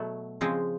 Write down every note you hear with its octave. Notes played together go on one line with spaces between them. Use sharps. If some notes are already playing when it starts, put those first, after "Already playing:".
Already playing: B2 F#3 A3
C#3 F3 G#3 C4